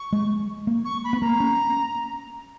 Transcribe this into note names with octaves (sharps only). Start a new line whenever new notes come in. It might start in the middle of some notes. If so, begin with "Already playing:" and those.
Already playing: C#6
G#3
A#3
C#6
B5
B3
A#3 A#5
C#4